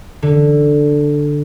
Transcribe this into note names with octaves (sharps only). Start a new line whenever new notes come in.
D3